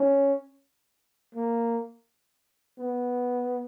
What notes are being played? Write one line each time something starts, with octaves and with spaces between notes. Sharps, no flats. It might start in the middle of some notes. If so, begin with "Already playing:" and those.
Already playing: C#4
A#3
B3